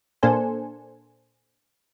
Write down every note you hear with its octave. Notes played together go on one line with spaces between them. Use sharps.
A#2 A#3 D4 A4 C5 G#5